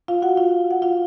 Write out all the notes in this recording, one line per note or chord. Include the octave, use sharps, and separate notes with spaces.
F4 F5
F#4 F#5
F4 F5
F#5
F4 F5